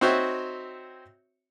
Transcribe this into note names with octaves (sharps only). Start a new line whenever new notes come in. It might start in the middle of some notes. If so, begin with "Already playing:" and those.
C4 D#4 F#4 C5 C#5 E5